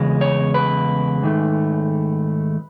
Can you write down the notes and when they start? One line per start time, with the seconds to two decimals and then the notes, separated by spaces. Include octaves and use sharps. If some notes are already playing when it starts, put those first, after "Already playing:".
Already playing: E2 C#3 G#3
0.21 C#5
0.54 B4
1.22 G#2 D#3 A3